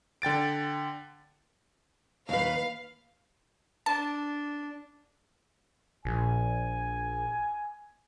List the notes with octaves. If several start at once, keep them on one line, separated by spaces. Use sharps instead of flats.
D3 G5 A6 D7
D#2 B4 F5
D4 A5
A#1 G#5